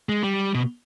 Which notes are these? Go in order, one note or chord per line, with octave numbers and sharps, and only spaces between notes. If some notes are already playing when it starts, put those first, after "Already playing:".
G#3
G3
B2